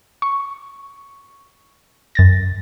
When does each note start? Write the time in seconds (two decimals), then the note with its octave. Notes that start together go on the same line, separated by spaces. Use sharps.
0.22 C#6
2.15 F#2 A6 A#6